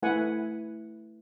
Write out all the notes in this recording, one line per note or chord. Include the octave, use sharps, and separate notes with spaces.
A3 E4 B4 F#5 G#5